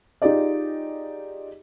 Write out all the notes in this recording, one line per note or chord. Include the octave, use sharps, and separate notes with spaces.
D#4 F4 G4 G#4 D5 D#5